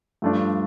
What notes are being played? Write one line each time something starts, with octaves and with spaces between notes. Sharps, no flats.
G2 F3 A3 D4